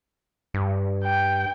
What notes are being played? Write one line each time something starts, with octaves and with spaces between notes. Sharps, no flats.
G2
G5